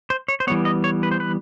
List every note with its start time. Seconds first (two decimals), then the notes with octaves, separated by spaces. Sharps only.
0.10 C5
0.28 C#5
0.40 C5
0.47 E3 G3 B3 C#5
0.65 D#5
0.84 C#5
1.03 B4
1.11 C5
1.20 B4